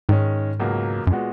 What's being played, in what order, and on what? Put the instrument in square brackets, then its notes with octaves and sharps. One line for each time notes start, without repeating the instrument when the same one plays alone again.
[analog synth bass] G#2 [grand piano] D#3 G#3 C#4
[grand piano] C#2 B2 F#3 A#3
[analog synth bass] F#2
[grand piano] A#2 G#3 B3 F#4